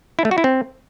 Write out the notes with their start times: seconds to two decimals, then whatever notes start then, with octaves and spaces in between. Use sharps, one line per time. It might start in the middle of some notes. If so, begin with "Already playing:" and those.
0.19 E4
0.25 A3
0.31 F#4
0.38 E4
0.44 C4